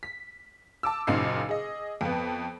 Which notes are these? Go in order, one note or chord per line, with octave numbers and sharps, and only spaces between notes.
B6
A5 D6 E6
F#1 A#2 C#3 D#4 C7
G#4 D#5
F2 B3